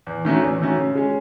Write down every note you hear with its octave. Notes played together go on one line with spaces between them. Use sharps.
E2
D#3 A3 C#4 F#4
E2
D#3 A3 C#4 F#4
C#3
G#3 C#4